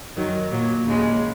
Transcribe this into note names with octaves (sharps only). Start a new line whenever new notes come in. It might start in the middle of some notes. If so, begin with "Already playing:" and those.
F#2 D#3 F#3
A#2 F#3
D#2 C#3 G#3